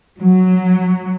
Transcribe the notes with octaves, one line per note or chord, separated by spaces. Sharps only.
F#3